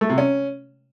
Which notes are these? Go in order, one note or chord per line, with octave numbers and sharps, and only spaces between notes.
A3
C3
C#4